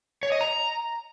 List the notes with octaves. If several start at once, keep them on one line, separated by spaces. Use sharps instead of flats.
C#5
D#5
A#5